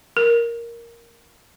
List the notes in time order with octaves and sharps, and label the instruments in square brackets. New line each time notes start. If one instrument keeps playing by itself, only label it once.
[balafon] A#4